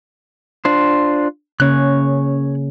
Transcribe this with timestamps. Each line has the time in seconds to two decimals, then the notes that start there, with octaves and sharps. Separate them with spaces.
0.65 D4 F4 C5
1.60 C#3 A#3 C#4 C#5 F#6